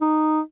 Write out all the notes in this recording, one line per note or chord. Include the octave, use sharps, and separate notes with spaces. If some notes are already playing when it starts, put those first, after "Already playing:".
D#4